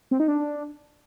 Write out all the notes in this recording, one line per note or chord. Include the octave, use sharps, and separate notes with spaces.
C4
D#4
D4